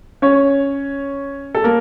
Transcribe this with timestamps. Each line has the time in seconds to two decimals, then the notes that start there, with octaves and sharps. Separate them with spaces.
0.22 C#4 C#5
1.55 A4
1.64 A#3 A#4